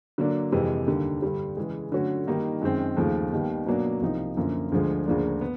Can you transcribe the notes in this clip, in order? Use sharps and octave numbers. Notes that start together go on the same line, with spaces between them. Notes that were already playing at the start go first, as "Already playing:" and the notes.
D3 F#3 A#3 D4
F2 C3 E3 G#3
D#2 D3 G3 A#3
G2 D3 G3
C#3 E3 G#3
D3 F#3 A3 C#4 F#4
D#3 G3 A#3 D#4
F#2 D#3 G#3 C4
D#2 C#3 F3 A3
D#2 D#3 G3 B3
B2 F#3 A#3 D4
C2 C3 F3 A#3 D#4
F#2 D3 F3 A#3
D2 D3 F3 G#3
D2 C#3 F3 A#3 D4
B3